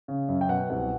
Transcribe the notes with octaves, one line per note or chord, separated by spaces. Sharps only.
C#3
F#2
G5
B2 F#5
C2